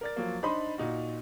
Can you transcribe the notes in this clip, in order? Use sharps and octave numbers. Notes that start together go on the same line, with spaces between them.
A#4 D5 A6
F3 F#3 A#3
D4 D#4 C5 D#5 B5 C6
A#2 D#4 F#4